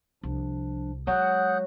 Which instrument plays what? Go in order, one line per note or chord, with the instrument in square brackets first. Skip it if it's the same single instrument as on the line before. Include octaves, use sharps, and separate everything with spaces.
[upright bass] C2 [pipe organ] F3 D4
[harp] F#3 [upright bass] G#3 [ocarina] F#5 [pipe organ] D#6 F#6 G6